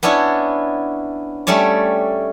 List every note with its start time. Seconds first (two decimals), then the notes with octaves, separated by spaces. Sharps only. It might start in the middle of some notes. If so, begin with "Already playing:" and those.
0.03 B3 C#4 D4 E4 C#5
1.47 G3 A3 C#4 C#5 D5